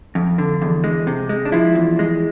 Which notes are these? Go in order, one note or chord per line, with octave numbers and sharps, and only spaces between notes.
F2
D3
E2
G#3
C3
G#3
D4
F3 E4
E2
G#3